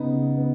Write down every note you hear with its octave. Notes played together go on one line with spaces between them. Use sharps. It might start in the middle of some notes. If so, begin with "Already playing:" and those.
Already playing: C#3 B3 D#4
C#3
B3